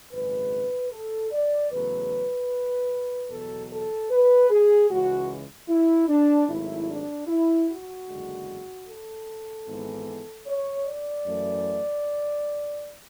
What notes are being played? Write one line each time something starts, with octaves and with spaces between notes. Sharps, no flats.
G#1 F#2 C#3 G#3 B4
A4
D5
E2 C#3 F#3 A3 B4
E2 B2 F#3 A4
A4
B4
G#4
C#2 C#3 E3 G#3 F#4
E4
D4
G#1 G#2 F#3 A3 E4
D4
E4
F#4
F#1 E2 D3 G#3
A4
G#1 G#2 E3 G#3 B3
C#5
D5
F#2 E3 A3